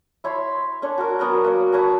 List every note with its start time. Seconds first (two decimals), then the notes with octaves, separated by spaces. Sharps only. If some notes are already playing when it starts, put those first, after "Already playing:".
0.24 E4 C#5 B5 C6
0.82 C#4 D4 C#5
0.98 F#4 A#4
1.19 F#3 B3 C#4 A#4
1.44 A#3 C#5
1.72 B4 C#5 A5 A#5